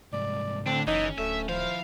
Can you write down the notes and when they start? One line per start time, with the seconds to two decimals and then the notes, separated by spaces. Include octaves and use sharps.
0.13 C2 G#2 D5
0.66 A2 D3 C4 D4
0.87 F#1 E3 C#4 D#4
1.18 D1 A3 E5
1.49 F3 E4 C5 F5